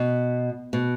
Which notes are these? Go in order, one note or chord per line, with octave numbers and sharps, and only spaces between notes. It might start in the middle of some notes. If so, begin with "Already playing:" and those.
Already playing: B2
B2